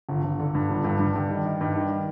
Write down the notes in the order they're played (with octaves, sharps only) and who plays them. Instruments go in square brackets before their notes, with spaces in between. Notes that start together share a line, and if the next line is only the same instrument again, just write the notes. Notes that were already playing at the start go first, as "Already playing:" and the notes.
[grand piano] G1
G1
D3
G2
G1
G2
G2
G2
D#3
D#3
G2
D#3